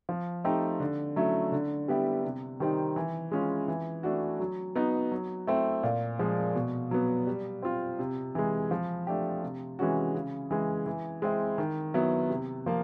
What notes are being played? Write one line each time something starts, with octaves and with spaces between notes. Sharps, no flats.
F3
A3 C4 D#4 G4
D3
F#3 A3 C#4 E4
D3
G3 B3 E4 G4
C3
D#3 G3 C4 D#4
E3
G#3 C#4 F4
E3
A3 D4 F#4
F#3
B3 D#4 F#4
F#3
A3 C4 E4
A#2
F3 G#3
B2
F#3 B3
G3
C4 F4
C3
E3 G#3
F3
A3 D4 G4
C3
E3 G#3 C#4 F#4
C#3
E3 G#3
E3
G#3 C4 E4
D#3
F#3 B3 E4
C3
F3 A#3